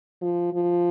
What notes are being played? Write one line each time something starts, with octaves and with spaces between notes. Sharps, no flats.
F3
F3